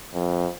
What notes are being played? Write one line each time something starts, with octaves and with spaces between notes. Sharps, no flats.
F2